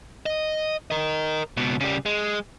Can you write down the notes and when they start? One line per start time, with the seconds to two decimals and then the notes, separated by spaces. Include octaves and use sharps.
0.26 D#5
0.91 A#4 D#5
1.57 C#2 B2
1.81 C#3 G3
2.06 G#3